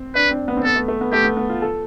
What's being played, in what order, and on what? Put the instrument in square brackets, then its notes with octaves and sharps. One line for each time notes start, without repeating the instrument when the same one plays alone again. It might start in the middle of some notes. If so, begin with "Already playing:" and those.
Already playing: [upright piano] C4
[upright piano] D4 [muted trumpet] B4
[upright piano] C4
B3
C4
[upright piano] B3 [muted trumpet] A4
[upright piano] A3
A3
B3
[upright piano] A3 [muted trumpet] G4
[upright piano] B3
B3
F4
A4